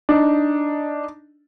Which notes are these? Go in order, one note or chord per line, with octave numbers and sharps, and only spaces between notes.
D4 D#4